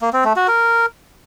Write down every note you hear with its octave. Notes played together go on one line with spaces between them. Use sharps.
A#3
C4
A3
F#4
A#4